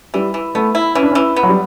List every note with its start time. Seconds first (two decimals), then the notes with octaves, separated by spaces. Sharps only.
0.14 E3 G3
0.34 E3
0.55 A3 B3
0.75 E4
0.95 E3 C#4
1.03 D4
1.11 C#4
1.15 E3
1.36 B3
1.43 F#3
1.49 G3